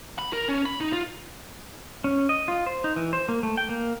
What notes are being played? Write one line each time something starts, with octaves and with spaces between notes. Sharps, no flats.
B5
A#4
C#4
B5
D#4
F4
C#4
D#5
F4
C5
D#4
E3
C5
A#3
A3
G5
A#3